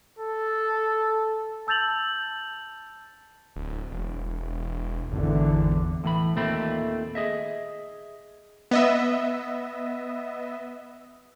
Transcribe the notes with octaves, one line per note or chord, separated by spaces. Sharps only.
A4
A5 E6 G6 A6 F7 F#7
D1
E1
G#1 E2 D3 E3
A2 E3 B5
D#2 A#2 A3 C4 B5
G#4 D#5 E5
B3 D#5 E5